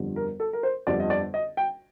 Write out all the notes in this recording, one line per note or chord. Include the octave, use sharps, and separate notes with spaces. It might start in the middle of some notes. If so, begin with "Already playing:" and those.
Already playing: G1 F2 D3 G3
A#4
A4
A#4
C5
G1 F2 D3 G3 D5
D#5
D5
D#5
G5